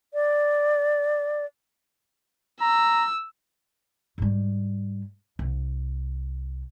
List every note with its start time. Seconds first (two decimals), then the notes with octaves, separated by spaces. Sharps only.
0.14 D5
2.61 A#5 E6
4.18 G#2 G3
5.39 C2